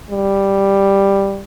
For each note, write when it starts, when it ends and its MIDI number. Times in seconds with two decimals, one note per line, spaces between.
0.11 1.42 55